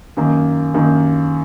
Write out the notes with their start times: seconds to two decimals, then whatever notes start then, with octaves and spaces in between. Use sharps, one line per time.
0.17 F#2 D#3 A#3
0.74 F#2 D#3 A#3